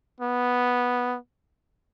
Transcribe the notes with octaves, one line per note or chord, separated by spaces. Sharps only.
B3